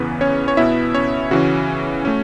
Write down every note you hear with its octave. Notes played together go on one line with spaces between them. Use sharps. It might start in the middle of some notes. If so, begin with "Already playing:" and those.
Already playing: E2 C#3 E3 B3 B4
C#4 C#5
C#5
B2 B3 E4 E5
C#4 C#5
C#3 E3 C#4 F#4
A3 C#4